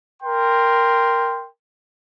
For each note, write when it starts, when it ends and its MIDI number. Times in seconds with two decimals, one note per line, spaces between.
0.22 1.48 70
0.22 1.48 79
0.22 1.48 84